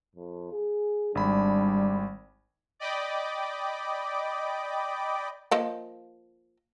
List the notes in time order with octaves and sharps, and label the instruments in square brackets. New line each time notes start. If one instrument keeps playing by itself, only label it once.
[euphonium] F2
G#4
[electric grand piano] G#1 B5 [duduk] G3 [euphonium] D4
[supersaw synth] D5 D#5 G5 B5 D6
[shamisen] F3 A#3 D#5